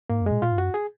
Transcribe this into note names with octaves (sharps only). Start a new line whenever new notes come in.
G#2 A#3
F#2
A#2 G#3
A#2 F4
G#2
F#2 F#4
G#4